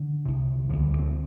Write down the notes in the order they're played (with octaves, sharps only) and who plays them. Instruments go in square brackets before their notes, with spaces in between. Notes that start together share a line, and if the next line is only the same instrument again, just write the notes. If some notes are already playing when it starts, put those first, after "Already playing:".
Already playing: [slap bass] D3
C2 C3
D2 D3 F3
A#3
G3
C4